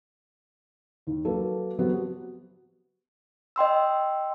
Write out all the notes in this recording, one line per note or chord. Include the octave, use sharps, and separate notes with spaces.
D#2
F#3 A#3 F#4 A4 B4
F#3 B3 C4 F#4 G4
D#5 G5 C6 E6